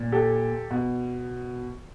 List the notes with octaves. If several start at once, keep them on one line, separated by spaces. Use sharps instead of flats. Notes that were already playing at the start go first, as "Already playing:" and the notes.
Already playing: A#2
G4 A4
B2